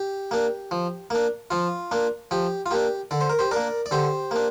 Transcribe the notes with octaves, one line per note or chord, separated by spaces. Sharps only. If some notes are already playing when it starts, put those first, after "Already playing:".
Already playing: G4
A#3 D4
F3
A#3 D4
F3 F4
A#3 D4
F3 G4
F4
A#3 D4 G4
D3 D5
C5
A#4
G4 C5
A#3 D4 A#4 D5
D5
D3 G4 C5
A#3 D4